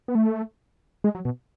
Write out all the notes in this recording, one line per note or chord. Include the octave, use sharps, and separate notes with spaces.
B3
A3
G#3
F#3
B2